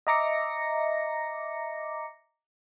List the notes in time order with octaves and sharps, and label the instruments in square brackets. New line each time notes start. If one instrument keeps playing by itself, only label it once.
[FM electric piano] D#5 E5 A#5 D6 A#6 C#7